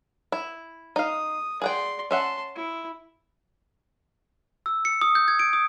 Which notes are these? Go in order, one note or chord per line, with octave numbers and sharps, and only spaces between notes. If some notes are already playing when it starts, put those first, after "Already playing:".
E4
D#4 F5 D#6
G#4 D5 F#5 G5 C6
C#4 E5 F#5 A5 C6
E4
E6
C#7
D#6
G6
G#6
D7
D#6